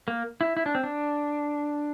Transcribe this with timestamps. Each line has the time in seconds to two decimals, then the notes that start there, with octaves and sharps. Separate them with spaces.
0.08 A#3
0.41 E4
0.57 E4
0.66 D4
0.75 C4
0.84 D4